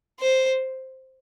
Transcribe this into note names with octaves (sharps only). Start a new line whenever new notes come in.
C5